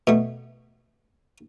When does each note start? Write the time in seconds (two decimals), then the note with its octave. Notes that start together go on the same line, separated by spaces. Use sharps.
0.07 B2 A3